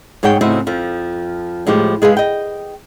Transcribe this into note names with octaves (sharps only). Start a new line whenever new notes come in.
G#2 G#4 C#5 F#5 G5
A2 C#3 C4 D#4 E4 F#4
F2 F3
A2 F3 G#3 G4
G#3 G#4 B4 F5
D#5 G5